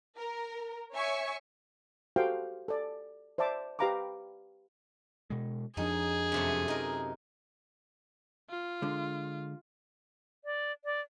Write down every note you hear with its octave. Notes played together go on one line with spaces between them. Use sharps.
A#4
C#5 E5 G#5 C#6
F#4 G4 A4 C5 F5 G5
A4 D5
C5 D5 E5 A5 D6
G4 B4 F5 A#5 B5 D6
B2 G#3
F2 F3 D4 D#4 G#4
F#2 C3 A3
D#4 A#4
F4
D3 G#3
D5
D5